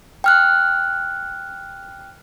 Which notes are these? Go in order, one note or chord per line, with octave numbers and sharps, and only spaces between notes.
G5 F6 F#6